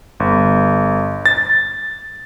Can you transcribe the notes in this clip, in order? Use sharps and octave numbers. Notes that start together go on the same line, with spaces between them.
G1
A6